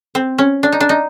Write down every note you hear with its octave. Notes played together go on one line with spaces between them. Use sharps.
C4
C#4
D4
D#4
D4
D#4